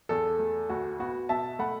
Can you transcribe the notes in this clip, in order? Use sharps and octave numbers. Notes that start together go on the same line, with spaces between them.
E2 A4
A3
D2 F#4
B3 F#4
B2 E5 A5
A3 F#5 B5